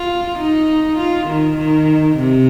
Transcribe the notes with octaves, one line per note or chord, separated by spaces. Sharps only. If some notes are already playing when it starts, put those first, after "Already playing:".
Already playing: F4
D#4
F4
D#3
D#3
C3